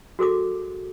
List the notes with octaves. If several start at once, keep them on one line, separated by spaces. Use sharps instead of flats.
F#4 G#4 A4 D6